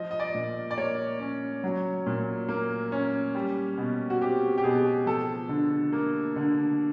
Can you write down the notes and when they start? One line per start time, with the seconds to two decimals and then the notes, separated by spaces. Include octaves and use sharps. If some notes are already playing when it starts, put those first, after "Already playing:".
Already playing: F3 D#5
0.11 D#5
0.20 D5
0.34 A#2
0.71 D5
0.78 A#3 C#5
1.20 C#4
1.64 F#3
2.06 A#2
2.48 A#3
2.92 C#4
3.35 G3
3.78 B2
4.10 F#4
4.21 C4 G4
4.58 G4
4.64 B2 G#4
5.06 F3 A4
5.49 D3
5.93 A#3
6.36 D3